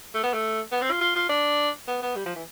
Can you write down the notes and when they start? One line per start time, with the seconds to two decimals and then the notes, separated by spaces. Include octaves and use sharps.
0.14 A3
0.23 B3
0.34 A3
0.72 B3
0.82 C4
0.91 F4
1.01 F4
1.15 F4
1.29 D4
1.88 B3
2.02 B3
2.16 G3
2.25 F3
2.36 E3